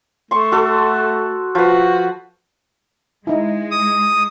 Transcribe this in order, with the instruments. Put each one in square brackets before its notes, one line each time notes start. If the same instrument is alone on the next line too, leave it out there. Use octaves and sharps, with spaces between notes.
[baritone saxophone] A3 [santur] C6 C#6
[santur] F#4 A4
[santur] F3 B4 [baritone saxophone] F#4
[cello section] G#3 [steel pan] D#4 E4
[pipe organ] D#6